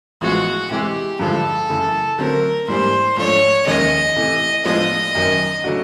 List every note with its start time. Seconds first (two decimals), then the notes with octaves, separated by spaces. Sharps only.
0.21 A1 A2 F3 G#3 B3 F#4
0.71 C3 E3 G#3 G4
1.19 G2 D3 F3 G#3 A4
1.69 F#2 C#3 E3 A3
2.19 D3 F#3 A3 C4 A#4
2.68 G#2 E3 G3 A#3 D4 C5
3.17 G#2 F3 A3 D4 C#5
3.66 F1 D#2 D#3 G#3 C#4 D#5
4.16 C3 E3 A3
4.65 A2 F3 G#3 B3 D4 D#5
5.15 G#1 F#2 D#3 F#3
5.64 C#3 F#3 A3 D4 F#4